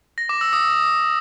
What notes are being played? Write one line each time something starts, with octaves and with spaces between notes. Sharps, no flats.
A#6
D6
E6
D#6